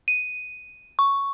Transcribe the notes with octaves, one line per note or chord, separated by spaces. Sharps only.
D#7
C#6